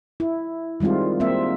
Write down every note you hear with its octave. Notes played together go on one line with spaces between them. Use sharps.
E4
D#3 G3 G#3 C4 F4
A#3 C4 E5